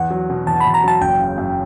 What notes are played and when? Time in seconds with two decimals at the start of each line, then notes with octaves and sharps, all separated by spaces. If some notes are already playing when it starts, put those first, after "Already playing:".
Already playing: E2 F#5
0.10 F#3
0.30 B2
0.47 E2 A5
0.60 B5
0.65 E2
0.74 A#5
0.84 F#3 A5
1.01 F#1 G5
1.20 C#3
1.38 F#2